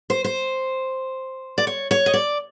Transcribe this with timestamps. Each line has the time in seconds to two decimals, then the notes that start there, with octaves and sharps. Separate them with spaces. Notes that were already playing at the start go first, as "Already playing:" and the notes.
0.10 C5
0.24 C5
1.58 D5
1.67 C#5
1.91 C#5
2.06 D#5
2.14 D5